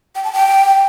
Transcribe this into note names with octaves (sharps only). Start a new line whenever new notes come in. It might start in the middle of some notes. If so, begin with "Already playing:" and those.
G5
A5
G5